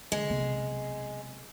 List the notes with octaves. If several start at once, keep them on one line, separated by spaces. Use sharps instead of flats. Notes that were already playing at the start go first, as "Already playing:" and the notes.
D3 G#3
B1 C3